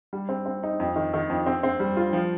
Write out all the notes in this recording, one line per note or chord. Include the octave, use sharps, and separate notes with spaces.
G3
C4
C4
D#4
F2
D#3
D#3
F2
C4
C4
G3
F4
F3